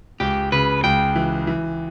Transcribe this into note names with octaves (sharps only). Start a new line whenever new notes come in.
C#2 G4
C#3 B4
C#2 G5
E3
E3